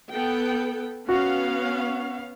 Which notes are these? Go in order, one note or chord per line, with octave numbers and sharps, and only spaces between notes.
B3 A4 G5
B3 C#4 F#4 F5